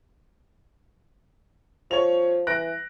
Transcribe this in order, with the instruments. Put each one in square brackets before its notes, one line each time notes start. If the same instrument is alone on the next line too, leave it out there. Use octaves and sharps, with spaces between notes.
[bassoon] F3 [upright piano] C#5 F7
[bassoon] E3 [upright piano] F#6 A#6 D7